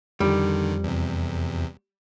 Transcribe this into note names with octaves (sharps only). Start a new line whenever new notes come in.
F2 D3 D#3 G3
E2 C3